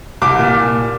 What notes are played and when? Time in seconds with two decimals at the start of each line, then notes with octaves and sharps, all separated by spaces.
0.22 C2 D6
0.39 A#2